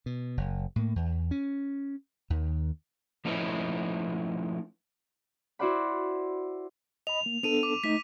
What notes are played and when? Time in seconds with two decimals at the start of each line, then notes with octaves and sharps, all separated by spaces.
0.06 B2
0.37 F#1
0.76 A2 A#3
0.96 E2
1.31 C#4
2.30 D#2 D#3
3.25 F3 A3 C#4 D#4 E4 B4
5.59 E4 F#4 C5 D5 F#5 B5
7.07 D#5 B5 F7
7.26 A#3
7.43 B3 D4 A4 D#7 F7
7.63 D6
7.84 A3 D#4 D#5 B6